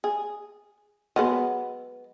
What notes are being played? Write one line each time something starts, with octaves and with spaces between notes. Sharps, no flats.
G#4
F#3 G#3 B3